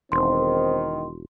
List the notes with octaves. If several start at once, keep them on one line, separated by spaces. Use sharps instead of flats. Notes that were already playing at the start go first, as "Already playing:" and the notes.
E1 D#3 C4 C6